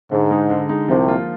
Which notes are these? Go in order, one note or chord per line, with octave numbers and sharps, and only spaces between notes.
G#2 D3
G#3 D#4
D3
G#3 D#4
C2 C3 F3
A#3 F4